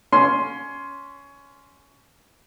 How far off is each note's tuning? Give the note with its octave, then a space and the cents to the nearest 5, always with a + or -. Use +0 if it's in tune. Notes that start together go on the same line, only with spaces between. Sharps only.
C#4 +15 C6 +0